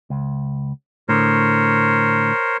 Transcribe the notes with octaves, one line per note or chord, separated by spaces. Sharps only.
C#2
A2 D3 A#4 C5 C#5